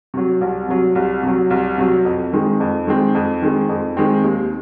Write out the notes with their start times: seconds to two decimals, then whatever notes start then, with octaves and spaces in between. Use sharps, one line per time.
0.14 C3 F#3
0.41 C2
0.69 C3 F#3
0.95 C2
1.23 C3 F#3
1.50 C2
1.78 C3 F#3
2.05 F2
2.33 D#3 G#3 C4
2.60 F2
2.87 D#3 G#3 C4
3.15 F2
3.42 D#3 G#3 C4
3.69 F2
3.97 D#3 G#3 C4
4.24 D#2